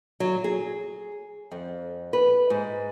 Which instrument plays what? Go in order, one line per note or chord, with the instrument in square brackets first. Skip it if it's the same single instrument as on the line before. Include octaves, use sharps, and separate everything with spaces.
[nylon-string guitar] F#3
G#4
F2
B4
G#2